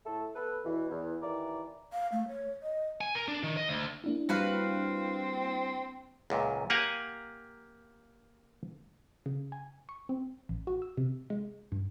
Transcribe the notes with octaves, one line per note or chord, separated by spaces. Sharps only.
A2 A3 A4
B3 A4 B4
E2 B2 E3
E2
D#2 E3 D5 A#5 D6
F5
A3
C#5
D#5
G#5
A#4
D4
D#3
D#5
D2
A#3 D4 E4
G3 C4 F#4 B4 F5
C#2 F#2 A#2
A#3 G4 F5 F#5 G#5 A#5
C#3
G#5
C#6
C4
A1
F#4
E6
C3
G#3
G2